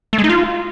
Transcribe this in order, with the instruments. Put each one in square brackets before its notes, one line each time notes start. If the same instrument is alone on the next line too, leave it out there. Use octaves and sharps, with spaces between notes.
[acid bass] A3
G#3
D#4
F4